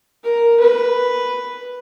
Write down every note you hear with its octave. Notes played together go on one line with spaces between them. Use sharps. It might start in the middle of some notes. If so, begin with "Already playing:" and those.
A#4
B4